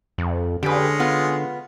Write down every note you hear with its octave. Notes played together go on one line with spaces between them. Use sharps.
F2
D3 G#3 C#4 G4 B4
B3 F4